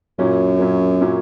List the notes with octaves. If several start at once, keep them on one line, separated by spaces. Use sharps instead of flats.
F#2 A#2 F#3 C#4
A#2 F#3 C#4
A#2 F#3 C#4